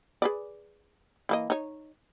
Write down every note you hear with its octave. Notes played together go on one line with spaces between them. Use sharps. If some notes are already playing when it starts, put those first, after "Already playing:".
G#4 B4 D5
E3 A#3 D#5
D#4 C#5